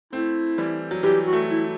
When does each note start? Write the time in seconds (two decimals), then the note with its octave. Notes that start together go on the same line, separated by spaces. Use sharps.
0.12 A3 C4 E4
0.58 E3 G3
0.91 F#3
1.03 E3 G3 G4
1.26 F#4
1.33 F#3 A3
1.48 E4